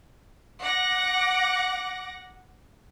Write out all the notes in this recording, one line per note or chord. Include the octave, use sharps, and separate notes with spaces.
F#5 D6 A#6